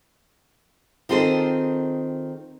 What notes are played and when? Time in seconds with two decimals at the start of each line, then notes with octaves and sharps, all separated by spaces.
1.09 D#3 C4 F4 G#4 A4 C5